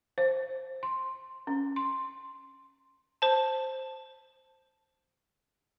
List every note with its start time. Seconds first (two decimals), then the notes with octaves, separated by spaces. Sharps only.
0.18 C5
0.83 C6
1.47 C#4
1.76 C6
3.22 C5 A5